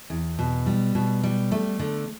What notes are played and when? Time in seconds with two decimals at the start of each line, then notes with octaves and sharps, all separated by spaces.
0.10 E2
0.39 B2
0.66 G3
0.95 B2
1.23 G3
1.52 A3
1.79 D3